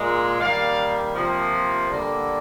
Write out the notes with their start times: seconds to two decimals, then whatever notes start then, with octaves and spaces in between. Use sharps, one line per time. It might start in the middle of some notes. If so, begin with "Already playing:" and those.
Already playing: A#2 G#3
0.41 D#3 G3 A#3 D5 F5
1.15 C3 F3 A#3
1.88 D3 G3 A#3